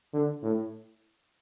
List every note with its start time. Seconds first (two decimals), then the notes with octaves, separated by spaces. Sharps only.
0.13 D3
0.43 A2